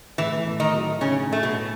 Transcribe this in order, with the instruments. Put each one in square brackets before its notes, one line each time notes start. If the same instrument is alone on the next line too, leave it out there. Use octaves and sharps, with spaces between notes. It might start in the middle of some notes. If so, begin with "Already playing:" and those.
[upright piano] A2 [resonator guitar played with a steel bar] E3 E4
[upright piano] A3
[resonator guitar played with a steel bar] D#3 D#4
[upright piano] F#3
[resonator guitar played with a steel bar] C#3 C#4 [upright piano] D#4
[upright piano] A2 [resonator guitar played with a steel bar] A3
[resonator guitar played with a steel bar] B2 B3
[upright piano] A3